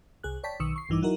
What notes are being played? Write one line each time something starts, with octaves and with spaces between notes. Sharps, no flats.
C2 G#4 F#6
C#5 D5 G5 A5 B6
B1 D#3 C#6 D#6 E6 C#7
C#6 C7
A#1 G2 E3 D#4 D6
F#3 D#4 E4 F#4 A#4